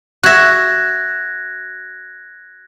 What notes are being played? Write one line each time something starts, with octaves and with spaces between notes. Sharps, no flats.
F#4 E5 F#6 G#6 A#6